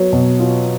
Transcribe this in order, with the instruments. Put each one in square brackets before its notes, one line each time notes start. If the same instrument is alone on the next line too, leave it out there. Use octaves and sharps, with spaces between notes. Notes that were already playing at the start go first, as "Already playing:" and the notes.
Already playing: [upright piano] F#3 B3
B2
F4